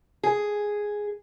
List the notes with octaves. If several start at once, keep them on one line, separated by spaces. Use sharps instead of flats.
G#4